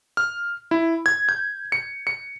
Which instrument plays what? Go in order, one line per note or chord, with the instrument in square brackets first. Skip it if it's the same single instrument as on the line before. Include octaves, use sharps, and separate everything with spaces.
[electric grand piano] F6
E4
G#6
G6
C#7
C#7